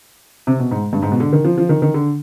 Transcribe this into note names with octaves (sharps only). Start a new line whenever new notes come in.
C3
B2
G#2
G2
G#2
B2
D3
D#3
F3
F3
D#3
D#3
D3